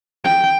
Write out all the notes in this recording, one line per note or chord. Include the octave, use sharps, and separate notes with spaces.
G5